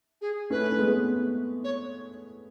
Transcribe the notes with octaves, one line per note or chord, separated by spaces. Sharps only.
G#4
A3 C#4 B4
C#4
G#3 B3
C#5